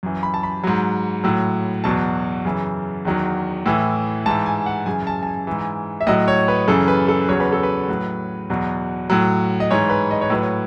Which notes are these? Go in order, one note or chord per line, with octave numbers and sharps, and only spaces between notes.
F#2 E3
B5
A5
B5
G#2 F#3
A2 F#3
E2 B2 F#3 A5
F#2 C#3 E3
E2 D#3 F#3
A2 E3
G#2 E3 A5
G#5
F#5
F#2 C#3 E3 G#5
A5
A5
G#5
G#2 E3
E5
A2 F#3 D#5
C#5
B4
F#2 C#3 E3 A4
B4
A4
E2 C#3 F#3 C#5
B4
A4
B4
A2 F#3
E2 B2 F#3
A2 F#3
D#5
G#2 E3 C#5
B4
D#5
C#5
A2 F#3 B4
C#5